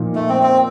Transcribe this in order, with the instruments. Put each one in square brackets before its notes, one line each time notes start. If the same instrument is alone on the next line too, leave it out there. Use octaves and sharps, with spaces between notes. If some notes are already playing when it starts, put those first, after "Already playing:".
Already playing: [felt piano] A#2 F3 A#3 D#4
[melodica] A3
C4
C4